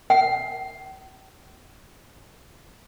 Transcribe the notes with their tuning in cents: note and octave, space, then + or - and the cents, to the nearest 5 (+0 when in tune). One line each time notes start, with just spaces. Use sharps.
G5 -45